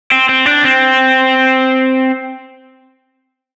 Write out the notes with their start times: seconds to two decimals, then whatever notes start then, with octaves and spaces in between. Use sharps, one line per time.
0.12 C4
0.29 C4
0.46 D4
0.64 C4